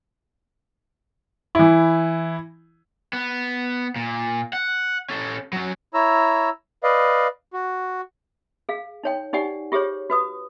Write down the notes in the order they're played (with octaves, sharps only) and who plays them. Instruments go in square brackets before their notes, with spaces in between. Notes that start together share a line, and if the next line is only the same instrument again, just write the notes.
[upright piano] E3 E4
[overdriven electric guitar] B3
A#2
F#5
C#4 A4
F#3 C#4
[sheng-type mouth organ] E4 C#5 A#5 E6
B4 D5 D#5 F5
F#4
[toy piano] G#4 F5
D#4 C#5 G5
D#4 G4 D5 F#5 G#5
F4 G4 G#4 C5 C#5
F#4 B4 D#6